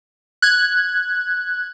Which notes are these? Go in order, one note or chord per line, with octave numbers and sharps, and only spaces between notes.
F#6 G#6